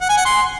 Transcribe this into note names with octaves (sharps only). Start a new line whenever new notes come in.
F#5
G#5
F#5
C6